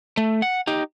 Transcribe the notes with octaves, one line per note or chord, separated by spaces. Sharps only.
A3
F#5
D#4 G4